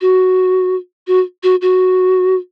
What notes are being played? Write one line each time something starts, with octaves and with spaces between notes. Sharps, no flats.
F#4
F#4
F#4
F#4